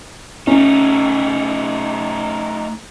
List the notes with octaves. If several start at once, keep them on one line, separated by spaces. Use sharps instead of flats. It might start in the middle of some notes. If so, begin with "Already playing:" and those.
A3 C#4 D#4